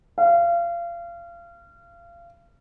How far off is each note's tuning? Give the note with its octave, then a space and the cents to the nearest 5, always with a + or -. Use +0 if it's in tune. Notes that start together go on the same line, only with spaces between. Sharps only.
F5 -30